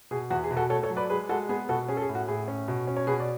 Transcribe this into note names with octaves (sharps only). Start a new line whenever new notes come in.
B2 G#4
E2 F#4
G#4
B2
F#4 A4
A3 A4 C#5
A4 C#5
F#3
B4 D5
G#3 G#4 B4
G#3 F#4 A4
B3 G#4
B2 F#4 A4
C#4 G#4
A4
G#4
A2
F#4
A2 G#4
C#4
B2
C#4
C#5
B2 G#4 B4
D5